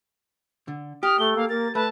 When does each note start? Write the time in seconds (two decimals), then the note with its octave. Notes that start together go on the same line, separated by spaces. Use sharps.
0.68 D3
1.03 G4 D#6 F6
1.19 A3 A4 G7
1.36 A#3 F5
1.49 A#3 A#4 A6
1.75 A3 B4 A5 B5